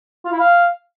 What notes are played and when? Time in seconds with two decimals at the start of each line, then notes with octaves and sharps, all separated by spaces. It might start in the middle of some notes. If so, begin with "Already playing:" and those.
0.25 F4
0.32 E4
0.39 F5